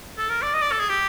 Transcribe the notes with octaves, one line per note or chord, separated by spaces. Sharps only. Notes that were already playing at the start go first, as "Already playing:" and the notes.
A4
A#4
D5
D#5
D5
A4
G#4
G4